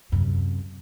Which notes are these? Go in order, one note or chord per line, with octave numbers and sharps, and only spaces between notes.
F#2 C3